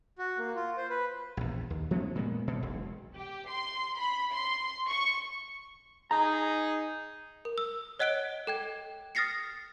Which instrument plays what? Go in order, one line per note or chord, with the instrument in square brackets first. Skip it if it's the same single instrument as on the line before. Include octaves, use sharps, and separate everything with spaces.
[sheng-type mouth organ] F#4
A#3
F4
C5
B4
[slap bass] A#1 E2
D#2
F3 A3 B3 C#4
A#2 G#3 A#3 B3
B2
E1 B1
[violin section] G4
C6
B5
C6
C#6
[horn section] D#4 G#4 [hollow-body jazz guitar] A#5
[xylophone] A#4
E6
C#5 D#5 F#5 F#6 D7 G7
A4 G5 G#6
D#6 F6 A6 A#6 C7 C#7